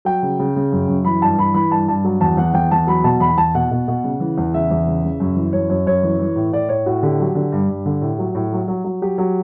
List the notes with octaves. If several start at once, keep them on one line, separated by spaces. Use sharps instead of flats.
F#3 G5
C#3
C#3
C#3
F#2
F#2
E3 B5
G2 A5
E3 B5
E3 B5
G2 A5
G2 A5
F#3
E2 A5
E2 F#5
E2 G5
E2 A5
F#3 B5
B2 A5
E2 B5
E2 A5
B2 F#5
B2
B2
C#3
E3
E2
C#3 E5
E2
C#3
C#3
F#2
E3
F#2 C#5
F#2 C#5
F#2 C#5
E3
E3
A2
A2 D5
A2 C#5
A2 F#4
D3 G4
F#3
D3
G2
G2
D3
A2
F#3
A2
F#3
F#3
F#3
F#3 G4
F#3